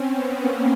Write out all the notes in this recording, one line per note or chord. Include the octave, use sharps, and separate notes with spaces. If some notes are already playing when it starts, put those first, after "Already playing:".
Already playing: C4 C#4
B3
A#3